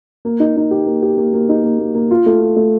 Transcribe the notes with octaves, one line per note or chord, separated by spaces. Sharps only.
A#3
D#4
D#4
G4
A#3
G4
A#3
A#3
D#4
A#3
A#3
A#3
F4
A3
F4
A3